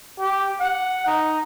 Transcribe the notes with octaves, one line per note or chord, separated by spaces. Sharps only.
G4
F#5
D#4